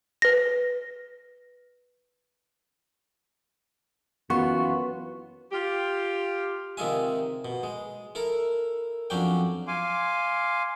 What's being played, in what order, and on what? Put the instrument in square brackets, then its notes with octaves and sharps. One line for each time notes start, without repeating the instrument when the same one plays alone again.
[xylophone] B4 A#6
[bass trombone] F#2 [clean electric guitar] E3 F4 F#4 [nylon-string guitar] B3 [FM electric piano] C#6
[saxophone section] F4 G4
[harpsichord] C3 D#3 G#3 F4 E5 G#5
B2
G#3
E4 A4 A#4
F2 F#3 C#4 D4 G5
[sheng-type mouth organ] F5 G#5 C6 D6